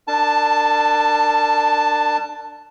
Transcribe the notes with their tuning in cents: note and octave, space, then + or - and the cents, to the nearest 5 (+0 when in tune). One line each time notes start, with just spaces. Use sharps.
D4 +25 A#4 -35 A5 +0